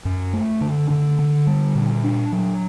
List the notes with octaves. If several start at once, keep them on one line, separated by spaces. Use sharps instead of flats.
F#2
A3
D3
D3
D3
G3
A#2
D4
F#3